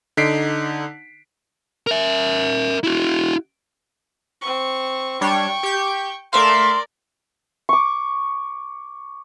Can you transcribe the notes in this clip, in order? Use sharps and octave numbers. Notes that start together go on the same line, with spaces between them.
D3 D#4 B6 C7 D7
A#4 E5
E4 F#4
C4 C#6
G3 D4 C#5 G5 C#6
G4 G6
A3 A#4 D5 E5 F5 C6
C#6 D6